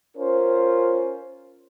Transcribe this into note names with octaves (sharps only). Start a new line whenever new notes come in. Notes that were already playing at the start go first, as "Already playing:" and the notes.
C#4 F4 A#4 C5